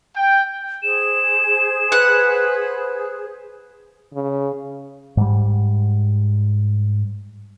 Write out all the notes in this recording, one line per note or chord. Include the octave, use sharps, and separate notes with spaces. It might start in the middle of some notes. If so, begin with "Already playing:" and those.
G5
G#4 C5 E7
B4 F#5
C#3
G#2 G3